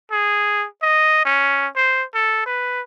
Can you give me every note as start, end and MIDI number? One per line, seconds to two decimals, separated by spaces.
0.11 0.66 68
0.82 1.22 75
1.25 1.67 61
1.76 2.04 72
2.15 2.43 69
2.46 2.81 71